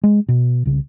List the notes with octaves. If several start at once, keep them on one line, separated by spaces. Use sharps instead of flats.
G#3
B2
C2 C#3